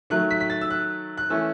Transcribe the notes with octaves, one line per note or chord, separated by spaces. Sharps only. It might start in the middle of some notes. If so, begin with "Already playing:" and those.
D#3 F#3 A3 F#6
B6
B6
A6
E6
F#6
F#6
E3 A3 C#4 E6